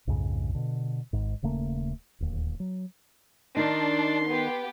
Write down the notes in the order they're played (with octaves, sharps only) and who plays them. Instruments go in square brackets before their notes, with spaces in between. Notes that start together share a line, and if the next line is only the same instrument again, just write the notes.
[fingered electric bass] B1 F2 G#2 C#3
B2 D3
G#1 G#2
D#1 C#3 A3 A#3
D1 D#2
F#3
[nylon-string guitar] D#3 D#4 [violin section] D4 [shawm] C6
[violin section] B3 G4